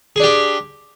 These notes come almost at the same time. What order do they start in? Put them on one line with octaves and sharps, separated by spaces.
G#4 D4 G4